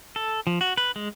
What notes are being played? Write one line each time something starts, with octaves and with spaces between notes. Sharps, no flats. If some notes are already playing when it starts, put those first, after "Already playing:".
A4
F3
F#4
B4
G#3